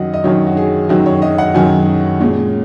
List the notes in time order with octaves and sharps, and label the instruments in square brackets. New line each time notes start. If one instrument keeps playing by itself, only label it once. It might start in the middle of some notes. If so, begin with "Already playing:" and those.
Already playing: [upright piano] F#2 D#3 F#3 D#5 F#5
D#5
F#2 D#3 F#3 C#5
F#4
G#4
F#2 D#3 F#3 F#4
C#5
D#5
F#5
F#2 D#3 F#3 G#5
A#2 G#3 C#4